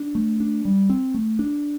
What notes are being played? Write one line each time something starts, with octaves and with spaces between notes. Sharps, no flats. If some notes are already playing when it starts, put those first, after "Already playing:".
Already playing: D4
A3
D4
G3
C4
A3
D4